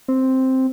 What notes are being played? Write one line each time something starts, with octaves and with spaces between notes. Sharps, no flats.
C4